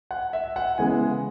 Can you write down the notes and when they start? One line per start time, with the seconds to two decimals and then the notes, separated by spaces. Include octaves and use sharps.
0.11 F#5
0.33 E5
0.56 F#5
0.78 C#3 E3 G#3 B3 G#5